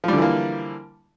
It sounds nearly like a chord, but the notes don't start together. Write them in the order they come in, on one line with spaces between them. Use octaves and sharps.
F3 G3 D3 E3 A#3